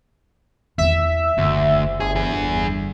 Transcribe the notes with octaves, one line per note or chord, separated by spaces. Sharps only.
E2 E4 E5
F#1 D2
G1 G#4
E2 G#4